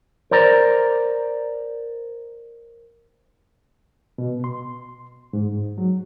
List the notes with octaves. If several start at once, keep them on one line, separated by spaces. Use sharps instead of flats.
A#4 C5 D5 A#5
B2
C6
G#2
F#3